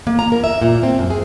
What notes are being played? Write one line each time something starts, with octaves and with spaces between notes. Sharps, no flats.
A#3
A#5
A#4
E5
A#2
C4
F#2
G#4